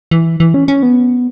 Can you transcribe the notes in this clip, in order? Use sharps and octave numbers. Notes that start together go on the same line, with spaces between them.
E3
E3
C#4
C#4
B3